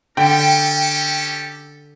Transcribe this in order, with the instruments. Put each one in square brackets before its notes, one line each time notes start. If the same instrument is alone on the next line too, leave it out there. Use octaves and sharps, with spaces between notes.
[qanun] D3 B5 [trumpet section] C#4 G4 A4 [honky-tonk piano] G5